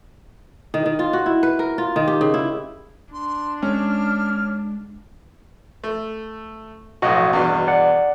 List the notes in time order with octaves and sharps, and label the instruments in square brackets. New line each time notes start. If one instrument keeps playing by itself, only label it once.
[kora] D#3
D#3
F4
F#4
E4
B4
A#4
F4
D#3
G4
C#3
E4
[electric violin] D4 [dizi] C6
[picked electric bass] G#3 [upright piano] C#4 [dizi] F6
[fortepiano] A3
[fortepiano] B1 F2 A2 [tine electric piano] F#4 D#5
[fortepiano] E2 G2 B2
[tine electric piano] D5 F#5